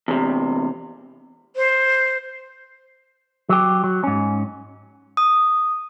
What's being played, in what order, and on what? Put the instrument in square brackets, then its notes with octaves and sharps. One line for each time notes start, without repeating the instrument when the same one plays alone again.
[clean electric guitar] E2 C3
[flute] C5
[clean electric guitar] F#3 G4
F#3
G#2 C#4
[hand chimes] D#6